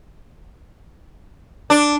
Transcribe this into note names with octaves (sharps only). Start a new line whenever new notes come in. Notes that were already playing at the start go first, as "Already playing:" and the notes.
D4